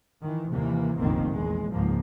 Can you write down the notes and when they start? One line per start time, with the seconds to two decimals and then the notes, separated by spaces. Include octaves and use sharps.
0.22 D#3 E3
0.52 D#2 C3 E3 A#3
0.99 F1 A#1 D#2 D#3 A#3 C4
1.29 A#1 E2 G#3
1.71 C#2 G#2 D#3 F3 A#3